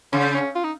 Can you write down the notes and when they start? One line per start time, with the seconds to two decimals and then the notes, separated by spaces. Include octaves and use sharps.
0.13 C#3 C#4
0.35 C#4
0.56 F4
0.64 D#4